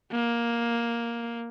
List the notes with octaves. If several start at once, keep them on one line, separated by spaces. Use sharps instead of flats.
A#3